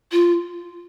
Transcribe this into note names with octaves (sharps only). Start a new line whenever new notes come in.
F4